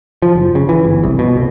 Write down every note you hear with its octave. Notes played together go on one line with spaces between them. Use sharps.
F3
F#1
C#3
E3
G1
C2
B2
C2